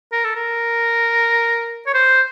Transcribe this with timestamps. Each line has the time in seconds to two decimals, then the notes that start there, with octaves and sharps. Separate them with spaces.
0.12 A#4
0.24 A4
0.35 A#4
1.86 C#5
1.94 C5